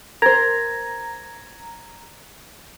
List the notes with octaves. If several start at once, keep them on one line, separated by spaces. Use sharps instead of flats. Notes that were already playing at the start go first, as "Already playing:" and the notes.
A#4 C5 A#5 G#6